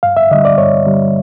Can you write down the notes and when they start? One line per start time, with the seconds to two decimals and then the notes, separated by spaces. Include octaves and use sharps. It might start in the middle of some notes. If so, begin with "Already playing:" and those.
0.03 G2 F5
0.17 E5
0.31 D3 G3 D#5
0.45 D5
0.58 G2 C#5
0.86 D3 G3